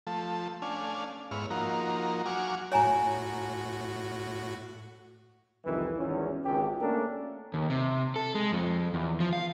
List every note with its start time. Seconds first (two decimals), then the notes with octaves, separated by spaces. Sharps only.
0.07 F3 A3 A4
0.62 A3 C#4 D4 F5 G#5
1.31 G#2 B3 E4 C#5 F6
1.50 F3 A#3 D#4 F#4 A#4
2.26 F#3 F#4 G#5 C#6 D6 F6
2.72 A2 F#4 C#5 G#5 A#5
5.65 C2 F2 D#3 E3
5.99 G#1 E2 C#4
6.45 G#1 C#2 G4
6.81 A3 A#3 C#4 D4 A4 A#4
7.54 D#2
7.70 C3
8.16 A4
8.35 G#3
8.52 F2
8.94 E2
9.20 F3
9.33 F5